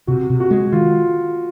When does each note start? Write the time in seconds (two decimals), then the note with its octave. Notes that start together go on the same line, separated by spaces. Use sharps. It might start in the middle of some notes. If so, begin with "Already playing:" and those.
0.07 C3 F#4
0.30 C3
0.40 F#4
0.51 G#3
0.72 D#3 F4